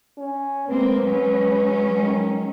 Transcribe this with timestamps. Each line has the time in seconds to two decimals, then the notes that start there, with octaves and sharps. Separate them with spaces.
0.18 C#4
0.69 G#3 A#3 C4 B4
1.05 F#3 G#3 C#4
2.02 D#3